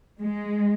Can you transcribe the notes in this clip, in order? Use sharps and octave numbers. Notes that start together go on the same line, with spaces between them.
G#3